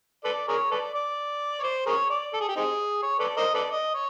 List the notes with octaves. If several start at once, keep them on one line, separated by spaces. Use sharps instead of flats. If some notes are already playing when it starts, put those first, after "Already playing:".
A4 B4 D5
G#4 A#4 C#5
A4 B4 D5
D5
C#5
C5
G#4 A#4 C#5
D5
A4
G#4
G4
C4 D#4 G#4
C#5
A4 B4 D5
A#4 C5 D#5
A4 B4 D5
D#5
C#5